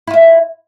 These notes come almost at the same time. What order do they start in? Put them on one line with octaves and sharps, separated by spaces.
E4 F4 E5